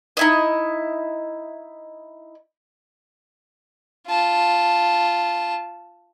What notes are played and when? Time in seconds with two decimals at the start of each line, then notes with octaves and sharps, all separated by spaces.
0.17 D#4 E4 D#5
4.07 F4 A5